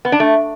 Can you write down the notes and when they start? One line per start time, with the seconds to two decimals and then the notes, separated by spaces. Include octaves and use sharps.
0.05 B3
0.12 D4
0.20 A3